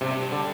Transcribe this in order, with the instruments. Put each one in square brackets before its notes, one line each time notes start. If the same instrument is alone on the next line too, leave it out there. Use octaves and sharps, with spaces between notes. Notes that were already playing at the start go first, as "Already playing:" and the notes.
[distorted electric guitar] G2 [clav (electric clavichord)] C3
[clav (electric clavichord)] D3